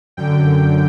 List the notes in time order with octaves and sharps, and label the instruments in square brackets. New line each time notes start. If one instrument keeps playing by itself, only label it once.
[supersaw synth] F#2 D3 G5